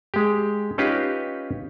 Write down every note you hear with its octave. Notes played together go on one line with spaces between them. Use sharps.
G#3 G4
C#4 D#4 F4 G4 B4